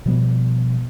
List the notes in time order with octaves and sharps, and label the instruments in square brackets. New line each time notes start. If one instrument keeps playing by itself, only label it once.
[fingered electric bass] B2 F3 G3 B3